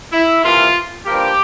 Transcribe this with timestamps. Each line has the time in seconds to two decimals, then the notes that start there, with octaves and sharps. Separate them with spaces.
0.12 E4
0.43 C3 E3 A#3 F4
1.07 G2 F3 A#3 G4